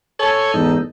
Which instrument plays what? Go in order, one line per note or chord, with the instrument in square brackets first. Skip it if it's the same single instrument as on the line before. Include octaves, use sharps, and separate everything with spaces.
[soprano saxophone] A4 [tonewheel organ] C#5 G#5
[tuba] E2 [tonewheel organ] G#2 D#4